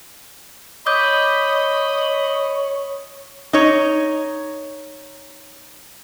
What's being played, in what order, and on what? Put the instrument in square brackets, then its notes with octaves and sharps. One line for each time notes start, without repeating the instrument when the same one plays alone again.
[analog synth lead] C#5 [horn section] D#5 B5 [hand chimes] D6 D#6 G6
[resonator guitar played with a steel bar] D#4 C#5